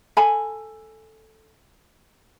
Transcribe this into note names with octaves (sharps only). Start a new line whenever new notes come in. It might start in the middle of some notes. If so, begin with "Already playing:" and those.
A4 G#5 B5